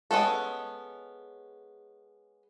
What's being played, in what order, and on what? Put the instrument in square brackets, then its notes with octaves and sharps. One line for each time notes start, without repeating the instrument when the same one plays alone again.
[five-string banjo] G#3 B3 C#4 A4